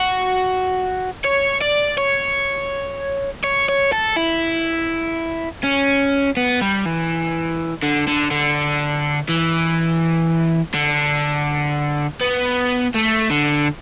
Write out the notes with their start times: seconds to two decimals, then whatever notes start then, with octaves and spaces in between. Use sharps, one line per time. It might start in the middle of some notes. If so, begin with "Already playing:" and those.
Already playing: F#4
1.24 C#5
1.61 D5
1.98 C#5
3.44 C#5
3.69 C#5
3.93 A4
4.17 E4
5.63 C#4
6.37 B3
6.61 G3
6.85 E3
7.82 D3
8.07 D3
8.31 D3
9.29 E3
10.74 D3
12.21 B3
12.94 A3
13.31 D3